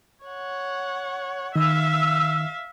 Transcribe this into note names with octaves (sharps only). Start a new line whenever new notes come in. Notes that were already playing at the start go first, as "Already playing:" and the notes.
C#5 F#5
D#3 E5 F5 E6